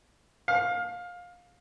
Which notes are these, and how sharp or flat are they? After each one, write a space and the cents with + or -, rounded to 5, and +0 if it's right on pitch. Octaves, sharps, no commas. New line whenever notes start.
F5 +20